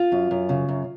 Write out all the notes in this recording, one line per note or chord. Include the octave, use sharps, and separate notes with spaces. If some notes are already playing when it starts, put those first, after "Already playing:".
Already playing: F4
F#2
F#2
C#3
F#2